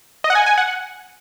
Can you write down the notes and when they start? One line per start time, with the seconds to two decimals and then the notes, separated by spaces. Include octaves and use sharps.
0.24 D#5
0.30 F#5
0.35 G#5
0.46 G#5
0.58 F#5